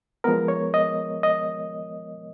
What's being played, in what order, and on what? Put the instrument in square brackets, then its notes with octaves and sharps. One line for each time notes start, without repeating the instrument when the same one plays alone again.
[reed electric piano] F3 G#3 B3 A#4
C#5
D#5
D#5